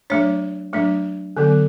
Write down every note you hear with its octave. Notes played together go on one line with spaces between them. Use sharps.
F#3 A3 D4 C#5
F#3 A3 D4
D3 F#3 B3